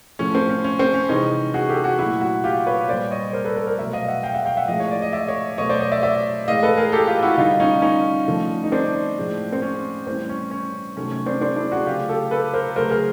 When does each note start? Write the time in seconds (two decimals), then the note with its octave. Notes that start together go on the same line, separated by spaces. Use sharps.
0.19 A2 F3 A3 C#4
0.35 C4
0.49 C#4
0.64 C#4
0.79 C4
0.94 C#4
1.09 C3 E3 G#3 C#4 D#4
1.54 F#4 G#4
1.69 G4 A4
1.84 F#4 G#4
1.99 A#2 F#3 A3 E4 F#4
2.21 E4 F#4
2.44 F4 G4
2.66 B4 C#5
2.89 A#2 G3 C5 D5
3.11 C#5 D#5
3.33 A#4 C5
3.44 A4 B4
3.56 A4 B4
3.67 A#4 C5
3.78 B2 F#3 A3 D5 E5
3.93 D#5 F5
4.08 E5 F#5
4.23 F5 G5
4.34 E5 F#5
4.46 F5 G5
4.57 E5 F#5
4.68 A2 F3 G#3 D#5 F5
4.80 C#5
4.91 D5
5.02 D#5
5.13 D5 E5
5.28 C#5 D#5
5.58 B2 F#3 A3 C#5 D#5
5.69 C5 D5
5.80 C#5 D#5
5.92 D5 E5
6.03 D5 E5
6.48 A2 E3 G#3 D#5 F5
6.63 A4 B4
6.77 G#4 A#4
6.92 G4 A4
7.07 F4 G4
7.23 E4 F#4
7.38 D3 G3 D#4 F4
7.60 C#4 D#4
7.82 C#4 D#4
8.28 D3 F3 A3
8.64 D#4
8.72 C4 D4
9.17 A2 F3 G#3
9.53 C4
9.62 C#4
10.07 A2 E3 G3 C4
10.29 C#4
10.51 C#4
10.97 C3 D#3 F#3 A3 C#4
11.12 C#4
11.26 C4 D4
11.41 C4 D4
11.56 D4 E4
11.71 F#4 G#4
11.86 C#3 F#3 A3 F4 G4
12.09 G4 A4
12.31 A4 B4
12.54 A#4 C5
12.76 C#3 F#3 A3 A#4 C5
12.91 G#4 A#4